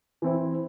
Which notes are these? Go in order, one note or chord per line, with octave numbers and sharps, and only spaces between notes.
E3 C4 E4